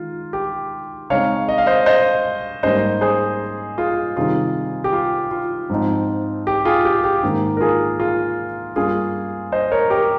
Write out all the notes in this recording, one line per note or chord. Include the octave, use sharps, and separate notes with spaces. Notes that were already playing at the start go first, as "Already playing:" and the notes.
Already playing: D#3 G#3 F4
G4
C#3 G#3 C4 D#4 C#5 F5
D#5
F5
C5 D#5
C5 D#5
G#2 G3 A#3 C#4 C5 D#5
G#4 C5
F4 G#4
C3 D#3 G3 C4 D#4 F4 G#4
G4
F4
F4
G#2 F3 C4 D#4
G4
F4 G#4
G4
G4
G#2 D#3 A#3 C#4
A#4
F4 G#4
F4 G#4
G2 G3 A#3 C#4 F4 G#4
C5 D#5
A#4 C#5
G4 A#4